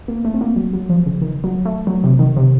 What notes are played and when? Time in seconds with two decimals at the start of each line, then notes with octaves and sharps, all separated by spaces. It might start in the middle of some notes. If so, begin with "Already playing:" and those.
0.08 A#3
0.25 A3
0.34 C4
0.41 A#3
0.56 F#3
0.73 F#3
0.89 F3
1.06 C#3
1.21 D#3
1.44 F#3
1.65 A3
1.87 F#3
2.04 C3
2.19 D#3
2.37 C3